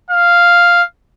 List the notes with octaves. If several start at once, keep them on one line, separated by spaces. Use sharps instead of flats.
F5